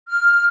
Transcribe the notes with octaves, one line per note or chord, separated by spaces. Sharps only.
F6